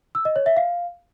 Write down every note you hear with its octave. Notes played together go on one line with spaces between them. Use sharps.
E6
D#5
C#5
E5
F5